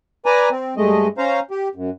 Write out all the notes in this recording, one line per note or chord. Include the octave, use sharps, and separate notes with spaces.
B4 D5 G#5 A#5
C4
G2 G#3 A3 D#5
C#4 C5 F5 A#5
G4
F#2